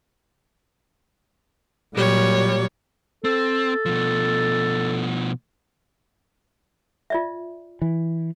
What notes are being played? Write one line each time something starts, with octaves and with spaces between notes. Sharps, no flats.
A#2 F#3 G3 C#5
C4 A4
B2 F3
F4 D5 E5
E3